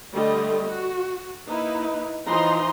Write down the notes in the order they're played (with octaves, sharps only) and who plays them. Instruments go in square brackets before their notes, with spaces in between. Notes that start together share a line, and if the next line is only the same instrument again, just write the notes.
[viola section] D3 G3 A3 D#5
F#4
A#3 D#4 E4 B4
E3 F3 D#4 A#5 C6